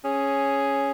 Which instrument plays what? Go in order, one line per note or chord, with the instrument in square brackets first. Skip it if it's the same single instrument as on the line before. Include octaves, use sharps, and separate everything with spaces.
[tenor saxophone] C#4 [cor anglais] G#4